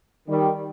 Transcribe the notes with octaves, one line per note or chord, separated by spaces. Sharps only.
D#3 G3